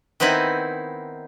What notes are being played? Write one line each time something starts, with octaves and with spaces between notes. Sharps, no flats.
D#3 B3 C4 D#4 E4